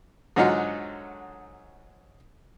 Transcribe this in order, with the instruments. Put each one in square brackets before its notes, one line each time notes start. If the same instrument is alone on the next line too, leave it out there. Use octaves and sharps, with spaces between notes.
[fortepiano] G#2 D3 F#3 D#4 F4 F#4